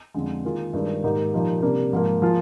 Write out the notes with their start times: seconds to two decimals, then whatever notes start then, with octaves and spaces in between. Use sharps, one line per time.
0.14 F2 D3 G#3
0.45 D#3 A#3 F4 G#4
0.73 G2 D#3 G#3 D4
1.04 G#2 D#3 A#3 D#4 G4
1.34 A#2 F3 A#3 D#4 G4
1.62 C3 G3 A#3 D4
1.93 G#2 F3 A#3
2.22 F3 A#3 F4 G#4